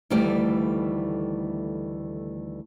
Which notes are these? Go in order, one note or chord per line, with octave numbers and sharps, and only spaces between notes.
D2 D#3 E3 G3 A3 D5